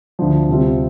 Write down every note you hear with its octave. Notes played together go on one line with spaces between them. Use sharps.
D2 D3 F3
D2 C3 G3 C4 F4